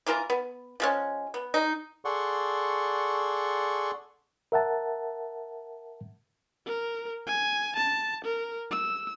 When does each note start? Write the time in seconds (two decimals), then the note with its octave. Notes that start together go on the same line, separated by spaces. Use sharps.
0.06 E3 A#3 F4 A#4
0.30 B3
0.80 F3 G#3 C#4
1.34 B3
1.54 D#4
2.05 G#4 A4 D5 F#5 C6 C#6
4.52 A#4 E5 F#5 A5
6.66 A#4
7.27 G#5
7.76 A5
8.25 A#4
8.71 E6